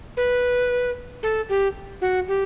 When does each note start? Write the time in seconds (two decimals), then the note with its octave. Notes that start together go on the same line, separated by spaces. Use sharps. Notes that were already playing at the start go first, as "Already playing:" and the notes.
0.17 B4
1.23 A4
1.49 G4
2.02 F#4
2.28 G4